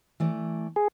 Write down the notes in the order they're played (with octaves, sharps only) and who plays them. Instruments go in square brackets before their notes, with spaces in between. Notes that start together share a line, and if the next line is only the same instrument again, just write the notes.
[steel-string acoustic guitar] E3 A3 D5
[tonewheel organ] G#4